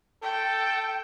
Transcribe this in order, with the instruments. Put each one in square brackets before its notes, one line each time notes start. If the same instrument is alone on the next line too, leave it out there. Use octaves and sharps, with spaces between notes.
[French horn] A4 [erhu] G5